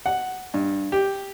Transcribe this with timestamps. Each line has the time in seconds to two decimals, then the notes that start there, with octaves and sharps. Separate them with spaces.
0.06 F#5
0.54 G2
0.92 G4